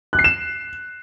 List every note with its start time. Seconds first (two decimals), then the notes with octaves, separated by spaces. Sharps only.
0.13 F#6
0.19 C7
0.24 E7